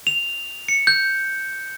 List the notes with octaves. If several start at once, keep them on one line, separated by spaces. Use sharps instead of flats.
F7
C#7
G6